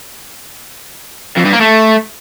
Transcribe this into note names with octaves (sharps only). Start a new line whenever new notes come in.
F2
G2
A#3
A3